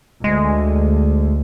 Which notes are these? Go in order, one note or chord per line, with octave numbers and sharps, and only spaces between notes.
D2 G#3